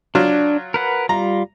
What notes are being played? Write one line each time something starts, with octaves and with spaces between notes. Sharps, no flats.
F#3 D4 F4
A#4 B4 F#5
G3 F4 A#5